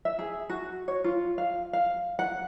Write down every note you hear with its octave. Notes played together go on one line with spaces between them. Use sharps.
E5
G#4
F#4
C#5
F4
F5
F5
F#5